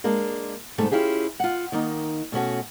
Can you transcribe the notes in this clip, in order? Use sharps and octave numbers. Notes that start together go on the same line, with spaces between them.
G#3 A#3 D4
G#2 C3 G3 A3
C#4 E4 F4 G4 G#4
F4 F#5
D#3 A#3 D#4
B2 A3 C#4 F#4